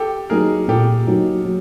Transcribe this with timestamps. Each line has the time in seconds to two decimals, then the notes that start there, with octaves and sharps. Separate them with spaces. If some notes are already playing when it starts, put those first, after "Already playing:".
Already playing: G4 A4
0.30 F#3 A#3 D#4 F#4 G#4 A#4
0.68 A#2 G4 A4
1.07 F#3 A#3 D#4 F#4
1.45 F#3